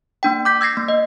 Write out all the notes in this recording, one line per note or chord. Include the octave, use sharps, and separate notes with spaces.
A#3 D4 G5
D6 G6 B6
E6 G#6 A#6 C7
A#3
D#5